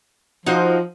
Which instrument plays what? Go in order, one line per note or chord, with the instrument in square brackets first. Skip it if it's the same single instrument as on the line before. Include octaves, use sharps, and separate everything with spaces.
[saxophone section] F3 [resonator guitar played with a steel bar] D#4 F#4 C5